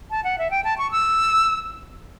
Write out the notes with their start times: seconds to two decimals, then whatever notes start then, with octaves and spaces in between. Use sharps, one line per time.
0.11 A5
0.24 F#5
0.38 E5
0.51 G5
0.64 A5
0.78 C#6
0.92 E6